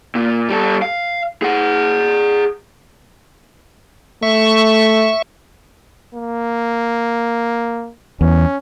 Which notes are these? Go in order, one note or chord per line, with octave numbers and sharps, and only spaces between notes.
A#2
G3 A4
F5
G#4 F#5
A3 E5 C#6
A#3
E2 C#4